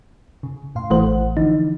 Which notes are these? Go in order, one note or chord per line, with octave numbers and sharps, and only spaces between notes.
C#3
A2 F5 C6
A1 E3 A3 C5 F#5
D3 E3 F3 D#4